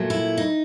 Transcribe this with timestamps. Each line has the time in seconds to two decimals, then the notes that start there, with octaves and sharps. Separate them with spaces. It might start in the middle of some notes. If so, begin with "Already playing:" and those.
Already playing: A#2 F#3 A3
0.10 E4
0.38 D#4